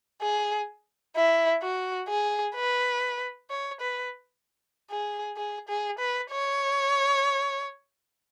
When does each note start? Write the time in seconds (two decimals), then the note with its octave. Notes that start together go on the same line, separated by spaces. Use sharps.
0.22 G#4
1.16 E4
1.62 F#4
2.09 G#4
2.55 B4
3.50 C#5
3.81 B4
4.91 G#4
5.37 G#4
5.69 G#4
5.99 B4
6.31 C#5